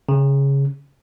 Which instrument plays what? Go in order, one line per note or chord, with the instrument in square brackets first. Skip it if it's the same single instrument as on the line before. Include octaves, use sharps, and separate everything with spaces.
[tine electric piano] C#3